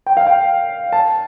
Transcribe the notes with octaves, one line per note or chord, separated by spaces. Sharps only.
G5
F5
G5
A5